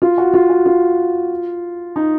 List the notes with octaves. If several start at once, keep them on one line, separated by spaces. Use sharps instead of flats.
F4
F#4
F4
F#4
F4
D#4